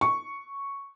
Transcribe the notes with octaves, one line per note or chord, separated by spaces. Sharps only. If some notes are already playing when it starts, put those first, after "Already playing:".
C#6